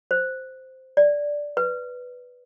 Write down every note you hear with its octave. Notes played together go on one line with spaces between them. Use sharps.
C5
D5
B4